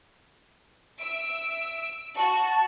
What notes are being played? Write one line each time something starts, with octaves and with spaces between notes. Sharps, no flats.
E5 E6 D7
F#4 A5